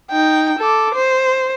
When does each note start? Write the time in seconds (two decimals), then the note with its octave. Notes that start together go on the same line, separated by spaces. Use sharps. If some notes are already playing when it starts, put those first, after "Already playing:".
0.11 D#4 G5
0.59 A4 D6
0.95 C5